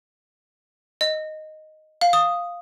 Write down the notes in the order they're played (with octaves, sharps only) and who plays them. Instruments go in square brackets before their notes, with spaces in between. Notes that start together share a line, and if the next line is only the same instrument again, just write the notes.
[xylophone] D#5
F5
D#6